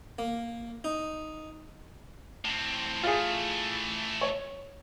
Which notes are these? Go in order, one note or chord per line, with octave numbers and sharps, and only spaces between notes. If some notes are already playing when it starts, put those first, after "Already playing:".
A#3
D#4
A2 C4
E3 A3 F4 G#4
C#5